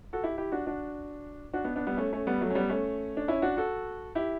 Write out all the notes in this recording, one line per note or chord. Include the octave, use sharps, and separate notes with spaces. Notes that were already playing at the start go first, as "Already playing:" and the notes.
F#4 A4
E4 G4
E4 G4
D4 F#4
D4 F#4
D4 F#4
B3 D4
B3 D4
G3 B3
A3 C#4
A3 C#4
G3 B3
F#3 A3
C#4
G3 B3
A3 C#4
D4
C#4 E4
D4 F#4
F#4 A4
E4 G4